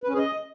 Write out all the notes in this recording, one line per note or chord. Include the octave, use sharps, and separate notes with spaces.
B4
C#4
G#4
D#5